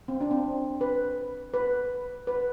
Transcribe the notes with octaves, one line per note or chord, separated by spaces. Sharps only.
C4
D4
C4
B4
B4
B4